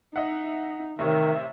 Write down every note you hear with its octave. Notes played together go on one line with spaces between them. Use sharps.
D#4 D#5 E5 F#5
A1 C3 D#3 C#5 E5